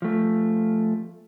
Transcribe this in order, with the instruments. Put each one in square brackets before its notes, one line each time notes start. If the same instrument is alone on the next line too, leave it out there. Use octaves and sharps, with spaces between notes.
[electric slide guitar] F3 A3